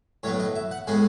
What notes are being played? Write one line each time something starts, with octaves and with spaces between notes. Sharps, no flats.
A2 F#3 B3 C#5
D#5
E5
F#5
A2 G#3 B3 G#5